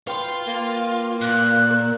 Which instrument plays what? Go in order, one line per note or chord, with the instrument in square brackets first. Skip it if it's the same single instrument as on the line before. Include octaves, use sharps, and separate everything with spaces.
[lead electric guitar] F4 [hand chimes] B4 G5 C6
[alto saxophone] A#3
[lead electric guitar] A#2 [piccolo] F#6
[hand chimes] A#4